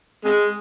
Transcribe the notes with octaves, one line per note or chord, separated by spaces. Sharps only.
C3 G#3